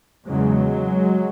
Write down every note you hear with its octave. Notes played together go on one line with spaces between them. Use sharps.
E2 C#3 F#3 G#3